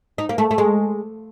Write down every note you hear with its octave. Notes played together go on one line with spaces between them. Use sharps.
D#4
A#3
A3
A3
G#3